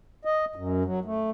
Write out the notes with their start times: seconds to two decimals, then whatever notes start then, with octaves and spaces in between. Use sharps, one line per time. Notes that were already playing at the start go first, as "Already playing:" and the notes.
0.25 D#5
0.55 F#2
0.85 F#3
1.05 A3